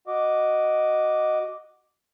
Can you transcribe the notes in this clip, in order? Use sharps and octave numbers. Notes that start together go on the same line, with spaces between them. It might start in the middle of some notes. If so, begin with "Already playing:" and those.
F#4 D#5 D6